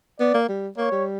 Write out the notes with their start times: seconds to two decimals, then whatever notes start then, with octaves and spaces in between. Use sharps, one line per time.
0.20 B3 D5
0.34 A#3
0.48 G3
0.77 A#3 C#5
0.92 G3